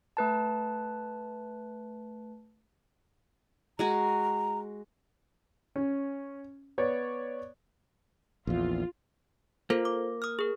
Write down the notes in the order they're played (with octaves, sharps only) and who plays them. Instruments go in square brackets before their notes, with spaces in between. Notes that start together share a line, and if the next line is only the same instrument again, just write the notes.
[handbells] A3 B4 A5
[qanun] G#3 F#4 G#5 [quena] A#5
[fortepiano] C#4
B3 C#5 D5
[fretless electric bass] A#1 E2 [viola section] F4
[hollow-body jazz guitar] A#3 [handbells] F4 A4 C5
[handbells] D6
D#6 F6
G#4 A#4